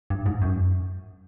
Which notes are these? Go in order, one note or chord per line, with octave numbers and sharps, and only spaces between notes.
G2
G#2
F#2